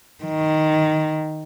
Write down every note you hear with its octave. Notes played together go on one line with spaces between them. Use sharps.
D#3